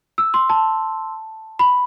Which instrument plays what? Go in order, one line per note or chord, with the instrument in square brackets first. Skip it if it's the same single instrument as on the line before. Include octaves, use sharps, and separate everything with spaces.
[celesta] E6
C6
A5
B5